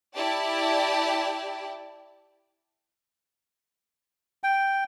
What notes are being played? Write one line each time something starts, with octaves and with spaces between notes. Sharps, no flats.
E4 G4 D5 G5 A5
G5